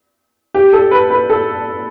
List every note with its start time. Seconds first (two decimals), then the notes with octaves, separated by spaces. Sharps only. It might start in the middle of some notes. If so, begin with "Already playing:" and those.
0.54 G4
0.73 A4
0.91 B4
1.10 B4
1.30 A4